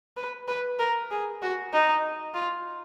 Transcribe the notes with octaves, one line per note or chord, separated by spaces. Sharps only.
B4
B4
A#4
G#4
F#4
D#4
F4